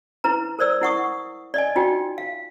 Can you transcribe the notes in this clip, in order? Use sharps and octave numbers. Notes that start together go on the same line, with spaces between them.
E4 B4 A#5
A#4 C5 D5 E6
E4 F#5 C#6 D#6
D5 D#5 G#5
D#4 F4 F#4 G5
F5